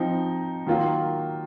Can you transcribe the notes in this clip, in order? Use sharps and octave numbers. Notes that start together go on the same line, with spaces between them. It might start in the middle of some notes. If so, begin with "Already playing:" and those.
Already playing: F3 C4 D#4
D#3 F#3 A#3 F4